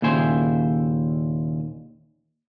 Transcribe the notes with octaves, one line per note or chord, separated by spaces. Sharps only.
D#2 A#2 C#3 E4 C5 G#5